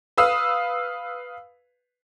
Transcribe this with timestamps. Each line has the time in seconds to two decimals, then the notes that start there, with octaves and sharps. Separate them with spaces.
0.17 B4 F5 D#6 E6